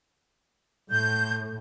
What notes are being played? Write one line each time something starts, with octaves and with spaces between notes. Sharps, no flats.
A2 G6